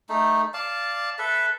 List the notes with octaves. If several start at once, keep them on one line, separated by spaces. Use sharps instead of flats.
A3 D#4
D5 F5 A5
A4 B4 E5